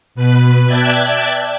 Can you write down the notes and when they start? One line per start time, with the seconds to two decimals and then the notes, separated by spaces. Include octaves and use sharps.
0.15 B2 B4
0.67 D5 E5 G5 A5 F#6 G#6